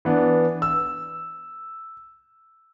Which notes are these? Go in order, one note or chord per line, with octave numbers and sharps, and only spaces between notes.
E3 B3 D4
E6